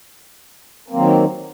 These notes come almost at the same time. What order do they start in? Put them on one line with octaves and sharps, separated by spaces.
A#3 C4 F#3 D#3